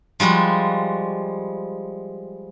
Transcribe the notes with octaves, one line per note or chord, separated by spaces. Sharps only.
F3 G3 G#3 F#4